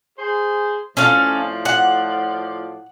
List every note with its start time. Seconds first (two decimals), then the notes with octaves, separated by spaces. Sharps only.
0.18 G#4 C5
0.97 A2 F3 C#4 A4 D5 F5
1.65 F#5